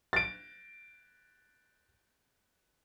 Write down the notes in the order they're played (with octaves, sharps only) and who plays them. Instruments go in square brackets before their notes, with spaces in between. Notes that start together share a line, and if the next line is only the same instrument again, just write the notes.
[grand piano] A6 D7